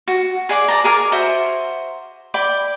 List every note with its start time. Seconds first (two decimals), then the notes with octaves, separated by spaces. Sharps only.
0.08 F#4
0.49 G#4 D5 C#6 D6
0.68 D5 A5 A#5
0.84 G#4 A#4 G#5 D6
1.12 F#4 C5 E5
2.34 D5 G5 B5 D6